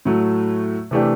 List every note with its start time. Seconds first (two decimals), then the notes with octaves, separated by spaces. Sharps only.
0.05 A2 F#3 A3
0.91 C3 E3 A3 D4 G4